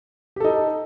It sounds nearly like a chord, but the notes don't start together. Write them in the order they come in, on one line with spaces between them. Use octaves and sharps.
G4 A4 D#4